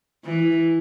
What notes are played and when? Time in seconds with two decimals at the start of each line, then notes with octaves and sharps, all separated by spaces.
0.25 E3